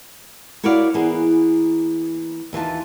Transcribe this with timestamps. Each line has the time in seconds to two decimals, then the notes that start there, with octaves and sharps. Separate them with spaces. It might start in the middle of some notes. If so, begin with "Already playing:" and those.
0.63 E4 F#4 A#4 C#5 D5 F5
0.94 E3 A#3 B3 G#4
2.53 D#2 E3 F4 A5